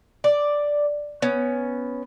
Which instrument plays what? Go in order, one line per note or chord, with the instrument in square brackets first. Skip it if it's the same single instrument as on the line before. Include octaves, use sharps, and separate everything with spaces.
[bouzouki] D5
B3 C#4